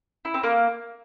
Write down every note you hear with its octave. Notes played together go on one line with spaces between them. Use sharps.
E4
C4
A#3